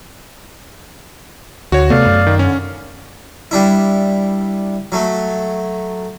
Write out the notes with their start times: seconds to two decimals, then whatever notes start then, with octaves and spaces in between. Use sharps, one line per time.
1.72 D2 F#4 C#5
1.90 C3 A3 B3 D5 F5
2.06 F#2
2.27 D#3
2.39 D3 C#4
3.51 G3 D4 E4
4.92 F#3 A3